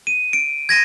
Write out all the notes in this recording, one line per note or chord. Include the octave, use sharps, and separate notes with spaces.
D#7
D7
G#6 A#6 D#7